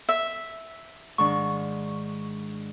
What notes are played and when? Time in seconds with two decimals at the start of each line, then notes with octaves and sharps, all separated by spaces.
0.09 E5
1.18 G#2 D#3 D4 C#6